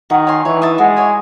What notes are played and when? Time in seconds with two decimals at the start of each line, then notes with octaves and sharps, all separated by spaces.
0.10 D#3 F#4
0.27 C#5 G#5 C6
0.45 E3 C#5
0.62 E5 A5 D#6
0.78 G#3 F#4
0.96 C#5 G#5